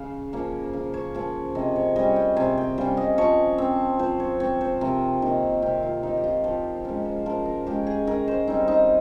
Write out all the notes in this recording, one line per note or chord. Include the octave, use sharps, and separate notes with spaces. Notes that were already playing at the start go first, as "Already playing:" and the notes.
Already playing: C#3 F5
F3 A#3 C#4
C#3 F5
C#5
F3 A#3 C#4
C3 D#5
C#5
G3 C#4 D#5
G5
C3 G#5
G5
G3 C#4 F5
D#5
F3 C#5
C4
F3 C5
C#5
C4 C#5
C5
C3 A#4
D#3 A#3
C3 G4
F4
D#3 A#3 D#4
G4
F4
F3 G4
G#3 C#4 A#4
C5
F3 A#4
A#4
G#3 C#4 G4
G#4
D#3 A#4
C5
G3 C4 D#4
D#4